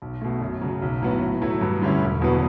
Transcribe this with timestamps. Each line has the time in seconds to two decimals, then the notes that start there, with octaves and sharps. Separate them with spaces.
0.02 B1
0.21 B2 A3
0.41 F#2
0.61 C#3 F#3
0.82 B1
1.02 A2 F#3 B3
1.21 A2
1.42 F#3 A3 E4
1.61 G2
1.82 D3 G3 C#4 E4
2.01 E1
2.22 E2 B2 F#3 B3